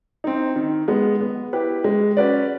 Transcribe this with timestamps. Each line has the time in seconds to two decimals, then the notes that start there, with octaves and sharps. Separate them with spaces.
0.24 C4 D#4
0.56 D#3
0.88 G#3 B3
1.21 B3
1.53 E4 G4 B4
1.84 G#3
2.17 C#4 F#4 B4 D5